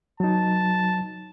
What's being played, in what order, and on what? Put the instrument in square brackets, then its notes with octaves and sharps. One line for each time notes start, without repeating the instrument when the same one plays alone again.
[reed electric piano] F#3 D#4 [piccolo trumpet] A5